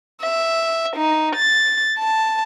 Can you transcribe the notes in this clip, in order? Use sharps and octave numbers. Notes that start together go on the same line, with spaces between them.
E5
D#4
A6
A5